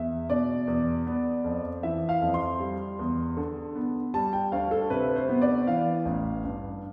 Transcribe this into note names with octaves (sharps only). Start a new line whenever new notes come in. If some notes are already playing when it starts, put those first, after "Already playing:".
Already playing: E2 E5
B2 D5
E2
B3
F2
E3 E5
F5
F2
C6
G3
E2
D3
B3
G3 A5
G5
D2 F5
A4
C3 B4
C5
B3
D5
E3 F5
A1
G2